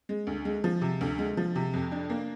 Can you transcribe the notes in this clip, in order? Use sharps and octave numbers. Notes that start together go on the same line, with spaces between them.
G#3
D2
G#3
F3
C3
D2
G#3
F3
C3
F2
D4
A#3